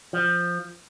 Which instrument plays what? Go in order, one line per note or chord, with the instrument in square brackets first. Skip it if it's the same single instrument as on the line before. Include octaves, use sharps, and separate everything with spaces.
[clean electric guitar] F3